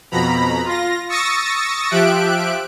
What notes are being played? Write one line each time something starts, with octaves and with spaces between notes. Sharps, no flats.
F2 B2 A#5 B5
F4 A#6
C#6 D#6 E6 A6 A#6 C#7
F3 G4 E5 F#6 D7